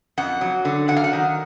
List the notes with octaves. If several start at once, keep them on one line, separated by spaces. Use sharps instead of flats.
F2 F#5
F#3
D3
F#3 F#5
F5
F#5
D#3